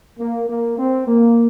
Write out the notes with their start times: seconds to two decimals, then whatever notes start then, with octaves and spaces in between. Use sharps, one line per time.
0.19 A#3
0.49 A#3
0.79 C4
1.08 A#3